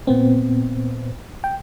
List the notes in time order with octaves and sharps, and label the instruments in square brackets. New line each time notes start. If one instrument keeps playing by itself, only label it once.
[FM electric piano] A#2 B3 C4
G5